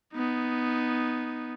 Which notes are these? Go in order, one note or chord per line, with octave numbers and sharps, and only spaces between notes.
B3 D#4